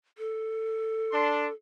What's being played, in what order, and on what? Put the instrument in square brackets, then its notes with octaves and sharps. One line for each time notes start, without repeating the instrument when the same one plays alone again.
[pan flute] A4
[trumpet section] D4 C6